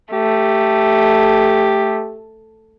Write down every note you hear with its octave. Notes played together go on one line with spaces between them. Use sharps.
A3 G4